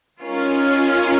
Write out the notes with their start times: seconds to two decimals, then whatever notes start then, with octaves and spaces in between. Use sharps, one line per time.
0.22 G#3 C#4 D#4 F4 A#4